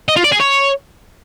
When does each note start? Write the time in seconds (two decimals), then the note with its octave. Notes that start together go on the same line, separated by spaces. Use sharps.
0.09 D#5
0.16 F4
0.24 D5
0.32 G#4
0.40 C#5